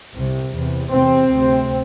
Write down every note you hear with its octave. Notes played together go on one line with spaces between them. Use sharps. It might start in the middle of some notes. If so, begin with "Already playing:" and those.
C2 C3
E2 C3
E2 C3 C4
D2 C3